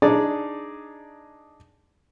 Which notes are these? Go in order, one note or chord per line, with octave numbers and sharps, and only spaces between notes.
D4 D#4 G#4 D5